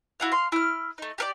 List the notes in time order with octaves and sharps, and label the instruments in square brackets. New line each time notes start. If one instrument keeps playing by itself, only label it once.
[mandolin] E4 F#4 F5
F5 C6
E4 F6
A3 D#4
G4 A#4 D5